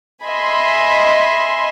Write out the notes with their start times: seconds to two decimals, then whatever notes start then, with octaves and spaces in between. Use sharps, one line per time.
0.25 D#5 E5 G#5 B5 C6